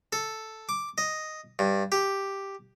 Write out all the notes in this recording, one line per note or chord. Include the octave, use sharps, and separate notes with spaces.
A4
D6
D#5
G2
G4